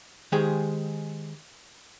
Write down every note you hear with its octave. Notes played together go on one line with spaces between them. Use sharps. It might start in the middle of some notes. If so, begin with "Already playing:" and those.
D#3 G#3 G4 G#4 C5